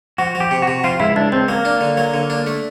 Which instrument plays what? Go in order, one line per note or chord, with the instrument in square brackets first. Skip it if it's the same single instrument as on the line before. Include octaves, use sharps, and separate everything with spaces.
[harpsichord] F3 [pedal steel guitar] F#4
[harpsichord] F3
[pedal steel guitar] G4
[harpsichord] C3
[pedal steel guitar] F#4
[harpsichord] C3
[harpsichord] F3 [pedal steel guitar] F4
[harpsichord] C#2 [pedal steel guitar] E4
[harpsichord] C#2 [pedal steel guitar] D4
[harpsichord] C#2 [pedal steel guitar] C4
[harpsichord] F#3 [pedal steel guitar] A#3
[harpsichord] D4
D3
F#3
D3
D4
A3